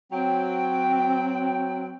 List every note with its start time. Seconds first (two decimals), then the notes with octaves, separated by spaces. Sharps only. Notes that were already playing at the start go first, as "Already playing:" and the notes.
0.12 F#3 C4 G5